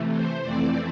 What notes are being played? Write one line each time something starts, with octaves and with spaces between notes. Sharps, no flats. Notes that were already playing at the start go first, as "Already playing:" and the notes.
Already playing: C3 E3 A3
C5
F2 E3 A3 C4 D5